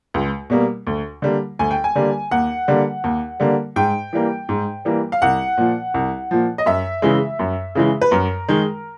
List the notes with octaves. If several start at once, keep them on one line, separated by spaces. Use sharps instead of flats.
C#2
B2 G3 A#3
D2
D3 G3 A#3
D2 G#5
G5
G#5
D3 G3 A#3
D#2 F#5
D3 G3 A#3
D#2
D3 G3 A#3
G#2 G5
E3 G3 A#3
G#2
E3 G3 A#3
F5
C2 F#5
A#2 F3
C2
A#2 F3
D#5
F#2 E5
C#3 E3 G#3
F#2
C#3 E3 G#3
B4
F#2 A#4
D#3 G#3